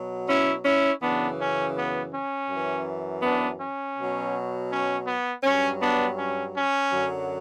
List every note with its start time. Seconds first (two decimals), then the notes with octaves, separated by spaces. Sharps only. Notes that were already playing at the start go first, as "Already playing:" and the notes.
Already playing: B2 F#3
0.28 C#4 E4
0.65 C#4 E4
1.02 F#2 C#3 E3 B3 D4
1.39 C#4
1.76 B3
2.12 C#4
2.49 F#2
2.54 E3
3.22 B3 D4
3.60 C#4
3.96 B2 F#3
4.70 C#4
5.07 B3
5.43 G2 F#3 C#4
5.80 B3 D4
6.17 C#4
6.54 C#4
6.90 F#2 D3 F#3